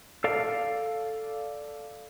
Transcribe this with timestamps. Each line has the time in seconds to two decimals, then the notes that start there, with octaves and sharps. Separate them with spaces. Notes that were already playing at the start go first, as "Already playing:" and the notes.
0.24 A4 D5 F5